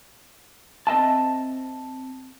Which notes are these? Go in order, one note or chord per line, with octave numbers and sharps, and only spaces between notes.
C4 D#5 E5 A5